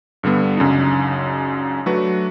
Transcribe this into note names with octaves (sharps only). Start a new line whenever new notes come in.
G2 D3 G3 B3
C#2 F#2 C#3 D4 D#4
F#3 A3 D4 F#4 B4